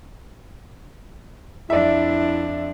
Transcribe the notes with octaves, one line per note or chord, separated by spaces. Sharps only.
F2 D4 E4 D5 E5